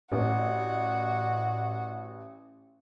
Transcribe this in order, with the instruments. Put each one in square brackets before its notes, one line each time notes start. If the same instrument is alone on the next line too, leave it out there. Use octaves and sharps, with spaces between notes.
[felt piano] A1 [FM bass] A2 [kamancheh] F#4 [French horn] D5